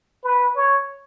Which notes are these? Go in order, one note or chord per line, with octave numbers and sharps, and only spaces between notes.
B4
C#5